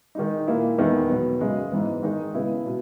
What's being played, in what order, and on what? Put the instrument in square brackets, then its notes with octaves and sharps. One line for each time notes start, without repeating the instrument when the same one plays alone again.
[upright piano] D#3 G#3 D#4
A#2 A#3 E4
E2 D#3 G#3 B3
B2 F#3 B3
F#2 C#3 G#3
G#2 E3 B3
D#3 G#3 D#4
C#3 G#3 B3 E4
B2